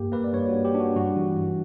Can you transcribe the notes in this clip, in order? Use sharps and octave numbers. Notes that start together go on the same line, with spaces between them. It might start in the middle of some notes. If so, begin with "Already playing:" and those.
Already playing: G2 A#3 G4
A#3 B4
D5
G2 C#5
F#4
G2
G4
D4
F#4
G2 F#4
E3
G2